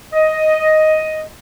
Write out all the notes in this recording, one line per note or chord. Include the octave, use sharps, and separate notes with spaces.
D#5